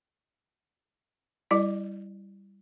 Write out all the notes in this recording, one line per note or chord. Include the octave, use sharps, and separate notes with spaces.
G3 E4 D5